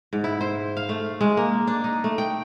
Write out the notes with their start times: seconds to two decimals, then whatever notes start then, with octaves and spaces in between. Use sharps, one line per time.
0.13 G#2
0.24 E4
0.41 C5
0.77 F5
0.89 A3
1.21 G#3
1.37 A#3
1.67 D4
1.84 D#4
2.04 A3
2.18 G5